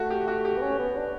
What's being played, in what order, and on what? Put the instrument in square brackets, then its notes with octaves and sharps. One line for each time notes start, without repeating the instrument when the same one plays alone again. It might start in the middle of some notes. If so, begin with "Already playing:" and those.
Already playing: [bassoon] A3 [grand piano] F#4
[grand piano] G4
F#4
G4
[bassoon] B3
C#4
B3
D4